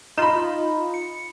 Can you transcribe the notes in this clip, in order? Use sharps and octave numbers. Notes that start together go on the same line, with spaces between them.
D#4 F4 D#5 B5 E7
C#7